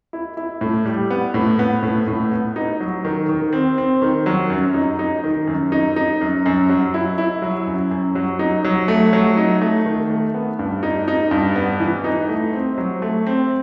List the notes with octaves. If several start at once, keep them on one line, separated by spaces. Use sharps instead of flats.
E4
E4
A2
G3
B3
A2
B3
A2
A2
B3
D#4
F#3
D#3
D#3
C4
C4
D#3
F#3
F#2
D#4
D#4
D#3
F#2
D#4
D#4
F#2
F#2
F#3
E4
E4
F#3
F#2
F#2
F#3
D#4
F#3
A3
F#3
D#4
A3
D#3
A3
B3
G2
D#4
D#4
G2
B3
E3
D#4
A3
C4
F#3
A3
C4